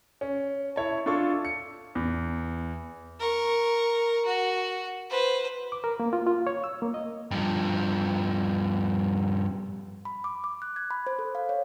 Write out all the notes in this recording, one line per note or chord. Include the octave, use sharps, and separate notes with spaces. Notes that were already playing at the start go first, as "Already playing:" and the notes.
C#4
E4 C#5 A5
D4 F4 A4 C#6
C#7
E2
A#4 C#6
F#4
B4 C5
D6
A#4
A#3
F4
F4
C#5
E6
A#3
D#5
G2 F3
B5
D6
D6
F#6
G#6
B5
C5
A4
F5
C#5